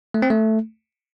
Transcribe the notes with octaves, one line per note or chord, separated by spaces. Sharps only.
A3
C4
A3